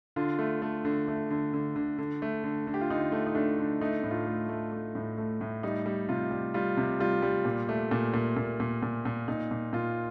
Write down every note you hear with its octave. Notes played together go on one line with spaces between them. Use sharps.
D3 F4
A3
A3
D3
A3
D3
D3
D3
D3
A3
D3
D3
G4
F4
D3 D#4
A3
D#4
A3 D4
D3
A3 D#4
A2
F4
A3
A3
A3
A2
A3
A2
G3 D#4
G3
C3 F4
G3
G3 F4
C3
G3 F4
G3
A#2
A3
A#2
A#2
A#2
A#2
A#2
A#2
A#2 D#4
A#2
A#2 F4